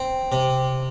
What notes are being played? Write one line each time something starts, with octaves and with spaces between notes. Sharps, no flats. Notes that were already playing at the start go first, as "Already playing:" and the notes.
Already playing: C4
C3